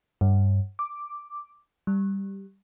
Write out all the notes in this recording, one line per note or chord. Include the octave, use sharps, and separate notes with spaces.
G2
D6
G3